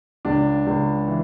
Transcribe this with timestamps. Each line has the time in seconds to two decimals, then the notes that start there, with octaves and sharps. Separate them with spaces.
0.25 C#2 D4
0.67 C#2
1.08 E3